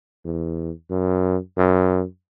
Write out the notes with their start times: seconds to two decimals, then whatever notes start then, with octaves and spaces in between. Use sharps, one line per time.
0.25 E2
0.90 F#2
1.57 F#2